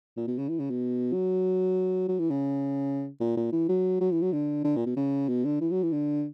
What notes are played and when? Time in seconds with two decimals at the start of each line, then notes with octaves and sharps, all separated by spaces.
0.17 A#2
0.27 B2
0.38 C#3
0.49 E3
0.60 C#3
0.70 B2
1.13 F#3
2.08 F#3
2.19 E3
2.30 C#3
3.20 A#2
3.37 A#2
3.52 E3
3.69 F#3
4.01 F#3
4.12 E3
4.22 F#3
4.33 D3
4.64 D3
4.76 A#2
4.86 B2
4.96 C#3
5.29 B2
5.45 D3
5.61 E3
5.71 F#3
5.83 E3
5.93 D3